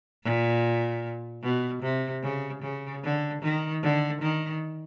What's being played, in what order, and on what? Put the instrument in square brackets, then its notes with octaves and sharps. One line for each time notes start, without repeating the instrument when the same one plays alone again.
[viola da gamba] A#2
B2
C3
C#3
C#3
D3
D#3
D3
D#3